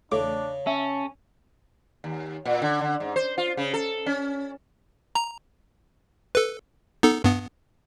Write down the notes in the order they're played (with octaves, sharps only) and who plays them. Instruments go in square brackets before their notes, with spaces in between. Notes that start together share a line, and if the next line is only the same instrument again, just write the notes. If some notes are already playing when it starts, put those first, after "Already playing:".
[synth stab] E2 A3 D6 [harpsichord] C#3 [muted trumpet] D4
[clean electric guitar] C#4 [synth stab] E5 [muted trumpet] A5
[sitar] D#2
A#2
D3
D3
G#2
C5
F4
C#3
A4
C#4
[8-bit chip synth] A#5
A4 B4
B3 D#4 A4
G2 B3